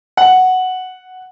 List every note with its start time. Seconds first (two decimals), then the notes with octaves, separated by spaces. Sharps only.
0.17 F#5